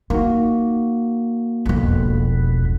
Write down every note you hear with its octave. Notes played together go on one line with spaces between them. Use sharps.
A#3 D#4 F#4
E1 B1 F2 B2